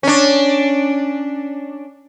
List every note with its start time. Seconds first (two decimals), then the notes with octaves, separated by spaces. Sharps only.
0.03 C#4 D4